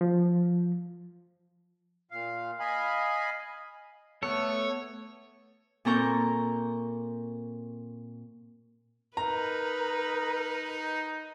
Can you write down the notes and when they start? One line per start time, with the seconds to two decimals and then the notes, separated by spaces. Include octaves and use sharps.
0.01 F3
2.11 A#2 F5
2.60 D#5 F5 G#5 B5
4.23 A3 B3 A4 C#5
5.85 A#2 C4 A4 A#5 C#6 G6
9.17 D#4 A#4 B4 A#5